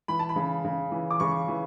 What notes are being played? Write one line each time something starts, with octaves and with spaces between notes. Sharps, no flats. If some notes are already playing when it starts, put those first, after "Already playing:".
E3 B5
A5
B5
C#3
C#3
E3
D6
C#3 C#6
E3